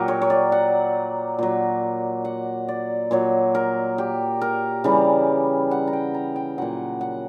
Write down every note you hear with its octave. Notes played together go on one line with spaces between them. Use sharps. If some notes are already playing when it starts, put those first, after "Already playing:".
Already playing: A#2 F#3 G4 A#4
C#5
C#5
D5
F#5
A#2 F#3
F#5
D5
A#2 F#3 C#5
A#4
G4
A#4
C#3 E3 G3
F#5
A#5
G5
A#5
G5
A#2 F#3 F#5
F#5